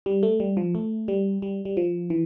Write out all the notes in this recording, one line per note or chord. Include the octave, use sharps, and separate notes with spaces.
G3
A3
G3
F3
A3
G3
G3
G3
F3
E3